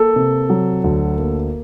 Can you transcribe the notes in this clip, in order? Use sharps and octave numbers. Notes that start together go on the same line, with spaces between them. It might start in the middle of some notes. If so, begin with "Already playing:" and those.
Already playing: A#3 A4
C3
F#3
D2
A#3